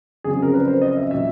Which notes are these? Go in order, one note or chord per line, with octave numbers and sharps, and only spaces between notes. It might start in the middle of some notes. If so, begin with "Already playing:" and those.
F2 C#3 F#3 G#4
A#4
B4
C5
D#5
E5
A#2 F#3 E5